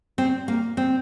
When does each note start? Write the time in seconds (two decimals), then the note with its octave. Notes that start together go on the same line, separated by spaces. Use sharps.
0.18 C4
0.48 A#3
0.77 C4